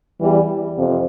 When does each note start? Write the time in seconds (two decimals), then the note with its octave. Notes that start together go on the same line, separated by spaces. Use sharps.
0.21 E2 E3 G3
0.77 F2 C3